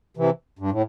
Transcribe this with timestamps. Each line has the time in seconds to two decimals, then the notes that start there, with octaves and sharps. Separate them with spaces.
0.17 C3 E3
0.59 G2
0.71 A2